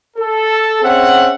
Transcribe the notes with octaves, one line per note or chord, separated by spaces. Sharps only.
A4
C4 C#4 G#4 E5 F#5